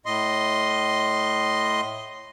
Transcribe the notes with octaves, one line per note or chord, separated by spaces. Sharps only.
A2 D#5 C6